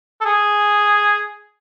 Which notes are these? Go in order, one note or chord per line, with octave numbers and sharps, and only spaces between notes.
A4
G#4